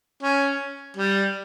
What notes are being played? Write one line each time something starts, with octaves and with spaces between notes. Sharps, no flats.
C#4
G3